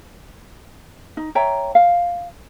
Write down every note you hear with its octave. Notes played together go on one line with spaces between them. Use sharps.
D#4
C#5 E5 G5 A#5
F5